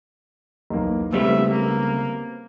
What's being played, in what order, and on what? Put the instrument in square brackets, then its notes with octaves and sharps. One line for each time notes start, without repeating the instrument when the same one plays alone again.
[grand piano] B1 E2 A#3
[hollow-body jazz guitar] C#2 G3 A3 [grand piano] B3 C4 D#4 [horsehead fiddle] E5
[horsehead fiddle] A#3